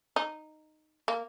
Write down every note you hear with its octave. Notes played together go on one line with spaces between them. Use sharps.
D#4
A#3